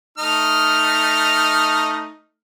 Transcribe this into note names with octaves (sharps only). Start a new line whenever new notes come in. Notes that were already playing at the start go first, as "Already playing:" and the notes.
A3 D#4 F6